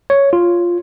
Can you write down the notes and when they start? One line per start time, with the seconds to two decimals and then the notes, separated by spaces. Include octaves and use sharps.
0.10 C#5
0.33 F4